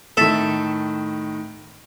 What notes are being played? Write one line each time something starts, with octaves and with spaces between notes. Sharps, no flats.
A2 D#3 A4 E5